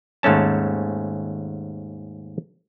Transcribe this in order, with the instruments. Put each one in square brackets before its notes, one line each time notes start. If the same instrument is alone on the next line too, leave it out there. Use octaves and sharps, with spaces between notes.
[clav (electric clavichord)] D#2 G#2 A3 C#4 A5